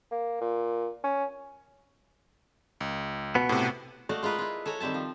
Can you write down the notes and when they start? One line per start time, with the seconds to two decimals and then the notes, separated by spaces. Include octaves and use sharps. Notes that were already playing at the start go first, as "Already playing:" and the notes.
0.11 A#3
0.41 A#2
1.04 C#4
2.81 C#2
3.35 B2 B3
3.49 A2 C3
4.09 A3 F#4 D5 D#5 F5
4.23 G#3 F4 A#4 B4
4.38 E4 F4
4.65 A4 C#5 G#5 A#5
4.80 D#3 G3 C4 E5 A5
4.94 F3